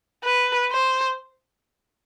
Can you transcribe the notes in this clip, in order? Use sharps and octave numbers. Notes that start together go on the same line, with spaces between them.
B4
C5